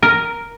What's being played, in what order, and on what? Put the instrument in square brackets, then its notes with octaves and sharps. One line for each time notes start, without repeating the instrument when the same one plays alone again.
[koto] A#4